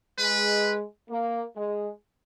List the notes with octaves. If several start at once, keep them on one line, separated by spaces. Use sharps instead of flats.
G#3 B4
A#3
G#3